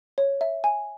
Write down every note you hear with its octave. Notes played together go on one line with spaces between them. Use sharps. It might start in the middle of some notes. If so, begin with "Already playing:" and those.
C#5
E5
G#5